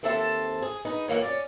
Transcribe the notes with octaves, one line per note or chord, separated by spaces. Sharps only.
D#2 C4 A4 C5 E5 A5
G#4
D#4 G#4 B4
F2 E3 A#3 C#5
C#4 D5